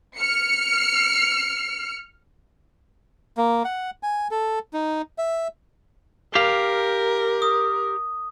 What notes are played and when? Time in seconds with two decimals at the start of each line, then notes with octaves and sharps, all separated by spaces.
0.17 F6 C#7
3.37 A#3
3.65 F#5
4.03 G#5
4.31 A4
4.73 D#4
5.18 E5
6.35 G4 A#4 F5
7.42 D#6